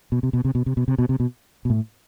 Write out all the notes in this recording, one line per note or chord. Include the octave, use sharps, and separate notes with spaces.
B2
C3
B2
C3
B2
C3
B2
C3
B2
C3
B2
B2
A2